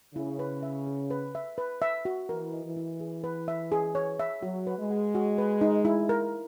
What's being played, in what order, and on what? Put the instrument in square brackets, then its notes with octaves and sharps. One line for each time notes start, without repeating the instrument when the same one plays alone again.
[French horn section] C#3 [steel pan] E4
[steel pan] B4
E5
G#4
B4
E5
B4
E5
F#4
[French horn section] E3 [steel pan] A#4
[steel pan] D#5
[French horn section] E3
[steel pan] E4
G#4
B4
E5
G#4
C#5
E5
[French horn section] F#3 [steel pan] F#4
[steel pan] B4
[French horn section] G#3
[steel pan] F#5
F#4
B4
D#4
E4
A#4